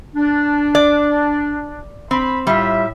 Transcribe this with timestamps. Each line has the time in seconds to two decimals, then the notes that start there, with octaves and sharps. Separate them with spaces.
0.15 D4
0.75 D5
2.11 C4 B5
2.47 A2 G3 F4 E5